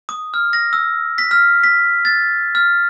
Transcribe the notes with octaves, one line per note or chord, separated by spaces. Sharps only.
D#6
F6
A#6
E6
B6
F6
B6
A6
F6